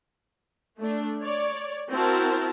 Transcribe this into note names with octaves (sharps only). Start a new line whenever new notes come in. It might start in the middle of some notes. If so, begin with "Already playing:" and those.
A3 D4
C#5 D5
C4 E4 F#4 A#4 A5